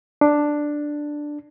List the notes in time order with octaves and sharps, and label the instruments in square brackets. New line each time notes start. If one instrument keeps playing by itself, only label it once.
[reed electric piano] D4